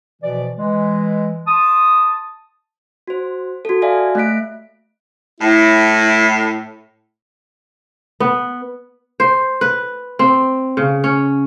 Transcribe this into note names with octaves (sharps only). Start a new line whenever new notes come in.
B2 E3 F3 D5
E3 G#3
A5 C6 D#6
F#4 C5
F#4 A4
F#4 G4 D5 E5 F5 G#5
A3 E5 F#6 B6 D7
A2 E4
B3
C5
B4
C4
C#3
C#4